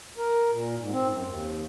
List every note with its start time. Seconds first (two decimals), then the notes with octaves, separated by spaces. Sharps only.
0.18 A#4
0.51 A#2
0.79 G#2
0.92 C4
1.08 F#2
1.27 D#2